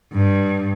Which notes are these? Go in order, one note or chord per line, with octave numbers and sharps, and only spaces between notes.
G2